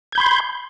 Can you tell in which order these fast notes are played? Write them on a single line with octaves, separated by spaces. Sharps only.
G#6 G6 B5 C6